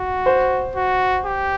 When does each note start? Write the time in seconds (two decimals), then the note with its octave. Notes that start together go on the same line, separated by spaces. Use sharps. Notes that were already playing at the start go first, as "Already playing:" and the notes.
Already playing: F#4
0.26 C5
0.75 F#4
1.25 G4